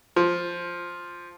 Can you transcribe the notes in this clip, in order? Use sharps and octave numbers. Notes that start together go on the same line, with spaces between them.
F3